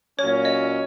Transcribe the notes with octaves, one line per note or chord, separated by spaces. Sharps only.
A#2 F#3 C#4 C#5
D#5